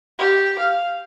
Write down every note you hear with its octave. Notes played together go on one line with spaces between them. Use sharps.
G4
F5